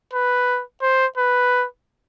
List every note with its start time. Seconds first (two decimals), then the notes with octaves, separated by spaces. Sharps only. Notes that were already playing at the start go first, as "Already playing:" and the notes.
0.13 B4
0.82 C5
1.17 B4